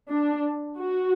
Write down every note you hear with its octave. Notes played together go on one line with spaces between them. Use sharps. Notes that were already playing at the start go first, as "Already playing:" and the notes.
D4
F#4